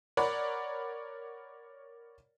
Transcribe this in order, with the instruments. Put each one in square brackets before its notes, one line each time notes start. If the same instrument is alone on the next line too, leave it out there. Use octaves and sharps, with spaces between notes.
[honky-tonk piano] A#4 C#5 D5 F#5 B5